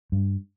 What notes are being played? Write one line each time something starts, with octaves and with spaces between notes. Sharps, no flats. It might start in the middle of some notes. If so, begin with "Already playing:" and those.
G2